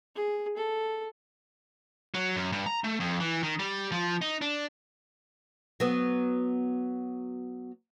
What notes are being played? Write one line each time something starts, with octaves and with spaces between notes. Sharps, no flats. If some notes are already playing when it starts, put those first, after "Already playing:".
G#4
A4
F#3
F#2
G2
A#5
A3
F2
E3
D#3
G3
F3
D#4
D4
F#3 B3